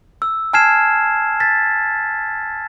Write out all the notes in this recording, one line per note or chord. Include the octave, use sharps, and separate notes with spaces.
E6
G#5 A5 F6 G#6 C7 E7
A6 B6